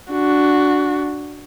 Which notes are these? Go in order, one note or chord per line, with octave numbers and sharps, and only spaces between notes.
D4 F#4